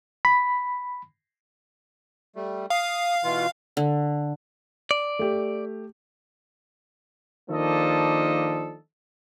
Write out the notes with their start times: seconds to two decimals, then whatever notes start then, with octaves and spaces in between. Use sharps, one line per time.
0.25 B5
2.36 G3 A3
2.70 F5 D#6
3.24 B2 E3 F4
3.77 D3
4.91 D5
5.19 A3 G4
7.50 D#3 F3 A#3 D4 A4 D#5